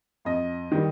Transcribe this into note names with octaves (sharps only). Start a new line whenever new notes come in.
F2 D#5
D#3 G3